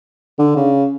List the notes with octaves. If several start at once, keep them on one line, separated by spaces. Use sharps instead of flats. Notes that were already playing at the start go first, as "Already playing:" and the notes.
D3
C#3